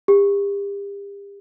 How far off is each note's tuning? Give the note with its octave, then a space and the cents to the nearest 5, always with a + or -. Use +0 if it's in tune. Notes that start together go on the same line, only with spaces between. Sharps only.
G4 +40